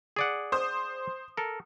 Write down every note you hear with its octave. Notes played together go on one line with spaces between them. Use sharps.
G#4 D5 F#5
C5 D#6
A4 A#4